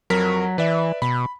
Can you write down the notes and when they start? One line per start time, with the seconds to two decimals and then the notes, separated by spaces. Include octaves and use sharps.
0.10 F2 F#3 A#4 B6
0.58 E3 B4 D5 E5
1.02 B2 B5